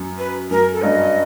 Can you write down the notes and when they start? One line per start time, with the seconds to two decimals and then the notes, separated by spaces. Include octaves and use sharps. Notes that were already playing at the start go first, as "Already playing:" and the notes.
Already playing: F#2
0.18 B4
0.51 F#2 A#4
0.73 A4
0.83 G2 D#5